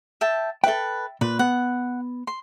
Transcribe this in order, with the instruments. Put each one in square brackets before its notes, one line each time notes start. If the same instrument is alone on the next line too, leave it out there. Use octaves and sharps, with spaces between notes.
[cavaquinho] E5 G5 A5
[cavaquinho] A4 B4 [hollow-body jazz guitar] E5 G5
[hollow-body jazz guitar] A#2 [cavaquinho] B4
[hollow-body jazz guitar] B3 [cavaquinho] F#5
[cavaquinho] C6